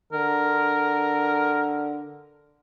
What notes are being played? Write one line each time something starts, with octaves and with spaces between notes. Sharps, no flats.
D3 A#4